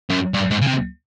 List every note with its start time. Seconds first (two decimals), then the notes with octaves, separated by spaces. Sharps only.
0.10 F#2
0.34 G2
0.51 G#2
0.62 C#3
0.67 C3